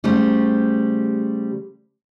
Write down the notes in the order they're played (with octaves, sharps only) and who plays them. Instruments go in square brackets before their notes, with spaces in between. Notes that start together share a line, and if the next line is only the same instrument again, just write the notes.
[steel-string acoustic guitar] C#3 G3 A3 G4 C5